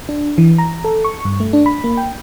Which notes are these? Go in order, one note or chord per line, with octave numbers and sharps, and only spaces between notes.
D4
E3
A#5
A4
C#6
G2
A3
D4
B5
A#3
G5